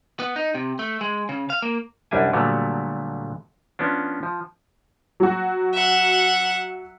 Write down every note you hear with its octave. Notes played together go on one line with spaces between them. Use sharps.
B3
D#4
C3
A3
G#3
C#3
F5
A#3
C2 F#2 G3 D4 E4 G#5
A#2 D3 F#3 G3 A3 B3
F3 B3 C#4 D4
F3
F#3 F#4
E5 F#5